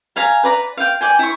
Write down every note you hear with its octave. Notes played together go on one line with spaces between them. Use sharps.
E5 F5 G#5 A#5
B4 D5 A#5
F5 G5
D5 G5 G#5
E4 C#6